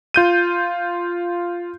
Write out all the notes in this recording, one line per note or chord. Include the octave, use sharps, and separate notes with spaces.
F4 G6 D#7